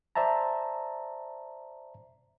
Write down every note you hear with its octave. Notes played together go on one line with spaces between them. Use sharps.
C5 D5 E5 A5 A#5